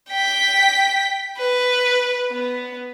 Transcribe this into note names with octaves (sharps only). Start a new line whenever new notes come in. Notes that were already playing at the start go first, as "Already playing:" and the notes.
G5 B6
B4
B3